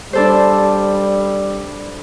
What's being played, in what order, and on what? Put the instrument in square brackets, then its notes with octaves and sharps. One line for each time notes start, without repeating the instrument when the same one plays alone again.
[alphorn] G3 [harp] D4 A4 C5